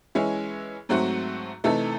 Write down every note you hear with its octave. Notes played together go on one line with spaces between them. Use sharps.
E3 G#3 C#4 E4
G#2 F#3 A3 C4 F#4
C3 E3 A3 D#4 A4